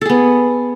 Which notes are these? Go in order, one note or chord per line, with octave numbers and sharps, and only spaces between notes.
B3 G#4 A4